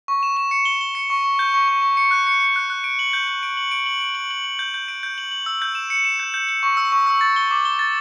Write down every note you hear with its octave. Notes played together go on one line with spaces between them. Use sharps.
C#6
E7
E7
C#7
G7
G7
C#7
C#6
C#6
G6
C#6
C#6
C#6
C#7
F#6
C#7
C#7
F#6
F#6
D7
F#7
G6
G6
D7
F#7
D7
F#7
D7
F#7
F#7
F#7
G6
G6
D7
G6
F#7
F#7
E6
G6
E7
C#7
E7
G6
G6
G6
C#6
E6
C#6
E6
A6
G7
D6
G7
A6